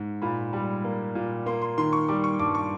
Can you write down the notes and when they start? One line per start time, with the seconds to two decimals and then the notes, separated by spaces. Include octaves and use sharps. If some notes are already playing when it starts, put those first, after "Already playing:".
Already playing: G#2
0.22 A#2 B5
0.53 G3
0.84 A#3
1.15 A#2
1.46 A#3 C6
1.62 C6
1.77 D#3 C6
1.93 C#6
2.08 G3 D6
2.24 C#6
2.39 G2 D6
2.55 C#6